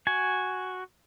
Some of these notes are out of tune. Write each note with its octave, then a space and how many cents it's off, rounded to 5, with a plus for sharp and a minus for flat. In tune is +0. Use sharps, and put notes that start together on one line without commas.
F#4 +0 G#5 +0